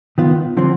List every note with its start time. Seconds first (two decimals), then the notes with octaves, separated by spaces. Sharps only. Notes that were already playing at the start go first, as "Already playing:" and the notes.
0.18 D#3 B3 F4
0.57 D3 F3 C4